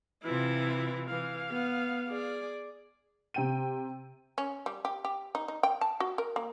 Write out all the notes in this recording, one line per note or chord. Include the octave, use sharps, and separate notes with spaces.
C3 E3 E4 F4
E3 F5
B3
G#4 D5
C3 G5 D#7
C#4
G3
G4
G4
D#4
D#4
G5
A5
F#4
A#4
A#3